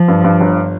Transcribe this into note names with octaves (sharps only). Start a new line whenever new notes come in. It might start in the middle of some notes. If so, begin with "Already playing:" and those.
Already playing: F3
G2
G2
G1